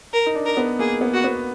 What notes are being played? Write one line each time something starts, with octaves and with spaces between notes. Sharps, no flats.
A#4
D#4
D4
A#4
B3
A#3 G#4
B3
F#4
B3